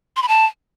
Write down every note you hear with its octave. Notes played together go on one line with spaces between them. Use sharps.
C6
B5
A5